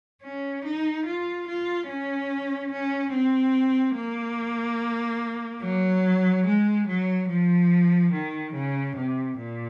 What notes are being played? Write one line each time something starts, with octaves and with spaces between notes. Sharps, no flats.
C#4
D#4
F4
F4
C#4
C#4
C4
A#3
F#3
G#3
F#3
F3
D#3
C#3
C3
A#2